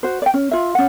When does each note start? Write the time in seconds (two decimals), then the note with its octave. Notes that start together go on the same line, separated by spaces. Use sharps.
0.03 F#4 C5
0.22 D5 G5
0.34 C#4
0.51 F4 E5
0.75 C#4 F#5